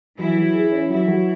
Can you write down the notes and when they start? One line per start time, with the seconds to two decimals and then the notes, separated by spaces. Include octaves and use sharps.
0.18 E3 F#3 E4
0.37 F#3
0.54 G#4
0.72 C#4
0.90 E3 F#3 E4
1.08 F#3